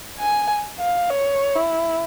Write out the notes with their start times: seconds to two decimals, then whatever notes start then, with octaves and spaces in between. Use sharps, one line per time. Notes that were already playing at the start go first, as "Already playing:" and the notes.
0.19 G#5
0.79 F5
1.10 C#5
1.55 E4